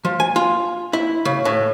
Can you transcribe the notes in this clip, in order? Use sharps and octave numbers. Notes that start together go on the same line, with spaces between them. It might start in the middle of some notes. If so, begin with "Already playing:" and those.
F3
G#5
F4
E4
C#3
A2